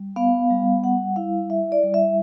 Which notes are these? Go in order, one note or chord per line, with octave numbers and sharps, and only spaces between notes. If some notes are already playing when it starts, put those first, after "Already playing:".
Already playing: G3
B3 F5
G3
G3 F#5
E4 F5
E4 E5
D5
G3
E5